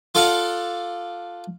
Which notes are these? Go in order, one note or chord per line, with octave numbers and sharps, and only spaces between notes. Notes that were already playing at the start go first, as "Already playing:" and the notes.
F4 A4 D5 F5 F#5